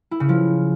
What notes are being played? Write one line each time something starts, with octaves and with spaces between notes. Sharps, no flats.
E4
C#3
F3